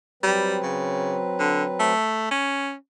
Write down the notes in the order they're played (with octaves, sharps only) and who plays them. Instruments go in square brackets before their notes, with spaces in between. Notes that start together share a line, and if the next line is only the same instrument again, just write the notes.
[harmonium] F#3 C4 B4 [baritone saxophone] G3
[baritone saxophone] C#3
D3
A3
C#4